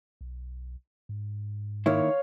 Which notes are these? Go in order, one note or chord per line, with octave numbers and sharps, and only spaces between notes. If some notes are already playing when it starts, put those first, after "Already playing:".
B1
G#2
D#3 A#3 E4 C#5 F5